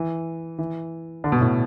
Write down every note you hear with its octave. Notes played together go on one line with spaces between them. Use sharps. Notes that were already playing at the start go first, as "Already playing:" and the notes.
Already playing: E3
E3
D3
B2
A2